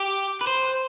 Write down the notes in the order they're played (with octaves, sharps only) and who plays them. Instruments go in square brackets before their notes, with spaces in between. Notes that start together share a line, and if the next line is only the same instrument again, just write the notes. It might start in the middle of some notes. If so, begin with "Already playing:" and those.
Already playing: [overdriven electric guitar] G4
B4
C5